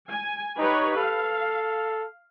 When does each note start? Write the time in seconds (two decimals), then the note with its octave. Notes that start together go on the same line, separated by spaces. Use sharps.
0.10 G#5
0.59 D#4 G4 B4 C#5
0.97 A4 F5